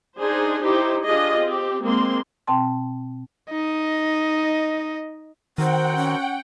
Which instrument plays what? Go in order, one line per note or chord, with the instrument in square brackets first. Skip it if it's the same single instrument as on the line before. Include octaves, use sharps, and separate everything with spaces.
[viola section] D4 D#4 G#4 C5
D#4 E4 G4 C5
D4 F4 G4 G#4 D#5
C4 G4
G#3 A#3 C4 C6
[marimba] B2 C4 G5 A5 C6
[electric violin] D#4 D#5
[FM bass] D#3 [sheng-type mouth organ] C4 F#4 A#4 [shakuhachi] C5 [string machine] F#5 G5
[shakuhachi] C#4